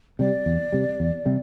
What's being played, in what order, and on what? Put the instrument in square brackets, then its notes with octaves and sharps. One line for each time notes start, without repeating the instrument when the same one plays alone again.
[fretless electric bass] C3 G3 [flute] D5
[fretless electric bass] E2
C3 G3
E2
C3 G3